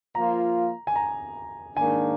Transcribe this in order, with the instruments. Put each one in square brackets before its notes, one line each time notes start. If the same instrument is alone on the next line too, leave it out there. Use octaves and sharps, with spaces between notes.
[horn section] F3 A#3 F4 [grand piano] A#5
[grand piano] G#5
A#5
[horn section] G#2 D#3 A#3 D4 [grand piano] G#5